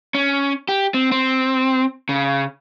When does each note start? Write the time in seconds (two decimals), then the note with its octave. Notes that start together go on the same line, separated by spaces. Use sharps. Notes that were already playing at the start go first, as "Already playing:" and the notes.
0.14 C#4
0.69 G4
0.94 C4
1.12 C4
2.09 C#3